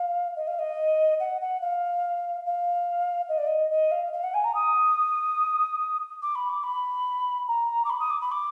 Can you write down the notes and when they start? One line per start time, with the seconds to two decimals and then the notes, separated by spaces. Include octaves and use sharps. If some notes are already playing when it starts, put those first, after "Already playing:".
Already playing: F5
0.36 D#5
0.47 F5
0.58 D#5
1.19 F#5
1.41 F#5
1.61 F5
2.46 F5
3.28 D#5
3.38 D5
3.46 D#5
3.70 D#5
3.91 F5
4.13 F5
4.23 F#5
4.34 G#5
4.44 A#5
4.54 D#6
6.22 D6
6.35 B5
6.49 D6
6.63 B5
7.47 A#5
7.84 D6
7.89 B5
7.99 D#6
8.10 D6
8.21 B5
8.31 D6